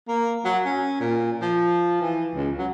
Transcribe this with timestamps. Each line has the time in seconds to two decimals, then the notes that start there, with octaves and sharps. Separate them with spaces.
0.08 A#3
0.45 F#3
0.65 C#4
1.01 A#2
1.42 F3
2.02 E3
2.36 C#2
2.58 F#3